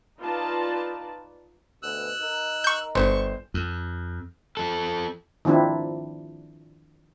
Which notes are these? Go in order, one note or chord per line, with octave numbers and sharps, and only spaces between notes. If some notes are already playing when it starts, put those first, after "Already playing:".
D#4 F4 B4 D5 A5
D2 B2 E6 F#6
D#4 A#4
C#6 G6
G1 C5 C6 C#6
F2
F3 A4
D#3 F3 C4 D4 E4